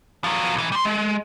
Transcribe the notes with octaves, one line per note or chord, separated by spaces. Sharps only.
F3 F#3
B1 E3
G3 C6
G#3